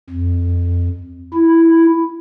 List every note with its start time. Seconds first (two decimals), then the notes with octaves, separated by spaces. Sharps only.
0.10 F2
1.34 E4